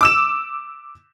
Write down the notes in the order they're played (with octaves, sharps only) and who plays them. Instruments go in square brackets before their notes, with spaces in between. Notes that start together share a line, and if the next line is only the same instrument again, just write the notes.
[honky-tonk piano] D6 E6 E7